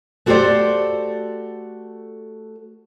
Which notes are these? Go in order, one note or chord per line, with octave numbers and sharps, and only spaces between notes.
A3 F#4 G4 A4 C5 D5